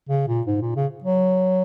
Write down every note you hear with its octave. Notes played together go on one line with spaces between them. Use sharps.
C#3
A#2
G#2
A#2
C#3
F#3